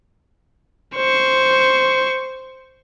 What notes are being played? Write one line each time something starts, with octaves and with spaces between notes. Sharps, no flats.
C5 C#6